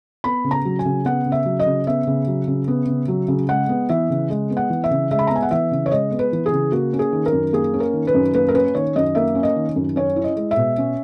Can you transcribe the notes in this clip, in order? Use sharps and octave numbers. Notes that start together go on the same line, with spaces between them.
B3 B5
C#3
A#5
F#3
G#5
C#3
B3 F#5
C#3
E5
F#3
D#5
C#3
B3 E5
C#3
F#3
C#3
B3
C#3
F#3
C#3
G#3 F#5
B3
E3 E5
C#3
G#3
B3
F#5
E3
E5
C#3
G#3 E5
B5
B3 A#5
G#5
F#5
E3 E5
C#3
C#5
G#3 D#5
B3
B4
E3
G#4
C#3
A#3 F#4
C#4
G#4
D#3
A#4
F#2
A#3 G#4
C#4
A#4
D#3
B4
F#2
A#3 B4
A#4
C#4 B4
D#3 C#5
F#2 D#5
A#3 E5
C#4
D#5
D#3
F#2
C#4 C#5
E4
D#5
G#3
E5
B2
C#4